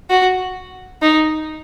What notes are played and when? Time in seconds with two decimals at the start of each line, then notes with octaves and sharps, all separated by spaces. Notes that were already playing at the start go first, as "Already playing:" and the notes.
0.10 F#4
1.02 D#4